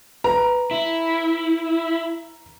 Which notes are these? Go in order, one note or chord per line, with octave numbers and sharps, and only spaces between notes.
B4 A#5
E4